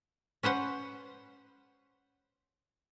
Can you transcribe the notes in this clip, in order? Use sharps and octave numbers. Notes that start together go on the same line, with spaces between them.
C#4 B4 C5 F#5